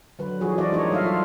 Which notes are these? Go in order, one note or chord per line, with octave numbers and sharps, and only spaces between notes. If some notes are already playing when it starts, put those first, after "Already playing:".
D3 F#3 B4
E3 F3 F#4 G#4
E3 D4 F4 F#4 D5 D#5
G#3 A#3 D4 D#4 C#5 D#5
F#3 G3 A4 E5 F5
F4